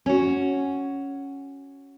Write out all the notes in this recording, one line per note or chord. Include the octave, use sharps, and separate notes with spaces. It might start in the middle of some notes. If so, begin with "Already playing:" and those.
C#4 F#4